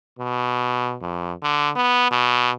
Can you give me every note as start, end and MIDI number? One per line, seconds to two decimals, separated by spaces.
0.19 0.96 47
1.02 1.32 41
1.43 1.70 50
1.76 2.07 59
2.11 2.51 47